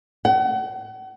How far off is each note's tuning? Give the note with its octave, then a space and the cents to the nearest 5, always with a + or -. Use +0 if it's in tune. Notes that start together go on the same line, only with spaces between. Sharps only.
F#5 +40